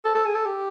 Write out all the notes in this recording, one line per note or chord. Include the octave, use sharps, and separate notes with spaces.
A4
A4
G#4
A4
G4